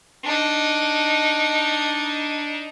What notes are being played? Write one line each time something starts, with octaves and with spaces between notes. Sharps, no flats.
D4 D#4